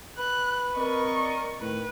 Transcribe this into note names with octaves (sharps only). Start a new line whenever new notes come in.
B4 F#6
C4 A#4 D5 D#5 C#6
A2 D#3 B4